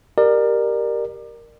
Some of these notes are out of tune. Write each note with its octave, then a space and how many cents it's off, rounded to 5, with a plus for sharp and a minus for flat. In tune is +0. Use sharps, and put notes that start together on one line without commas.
G4 +0 A#4 +0 D5 +30